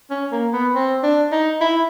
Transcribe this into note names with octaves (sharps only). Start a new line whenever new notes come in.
C#4
A#3
B3
C4
D4
D#4
E4